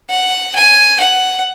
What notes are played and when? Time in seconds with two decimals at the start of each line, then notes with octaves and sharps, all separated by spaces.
0.10 F#5
0.56 G#5
1.00 F#5